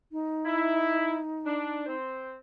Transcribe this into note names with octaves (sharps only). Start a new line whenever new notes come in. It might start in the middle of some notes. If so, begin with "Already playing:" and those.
D#4
E4
D4
C4 C5